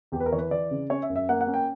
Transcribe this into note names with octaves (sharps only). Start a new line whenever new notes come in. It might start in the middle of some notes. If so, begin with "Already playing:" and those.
E2 G4
B4
A#4
E3 C#5
B4
E3 D5
C#3
C#4 C#5
E5
F#2
E5
A#3 F#5
F#5
C#4
G5